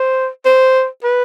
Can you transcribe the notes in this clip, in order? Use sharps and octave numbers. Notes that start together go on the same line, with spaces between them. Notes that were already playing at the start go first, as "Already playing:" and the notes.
Already playing: C5
C5
B4